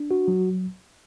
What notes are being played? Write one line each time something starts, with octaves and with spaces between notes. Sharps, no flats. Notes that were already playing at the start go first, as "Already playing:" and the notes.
Already playing: D4
F#4
F#3